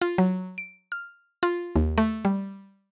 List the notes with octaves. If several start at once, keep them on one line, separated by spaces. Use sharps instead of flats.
F4
F#3
D7
F6
F4
D#2
A3
G3